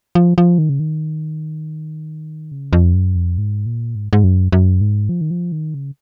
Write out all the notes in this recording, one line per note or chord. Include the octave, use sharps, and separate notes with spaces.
F3
F3
D#3
C#3
D#3
C#3
F2
F#2
F2
G#2
A#2
G#2
G#2
F#2
F#2
G#2
F3
D#3
F3
D#3
C#3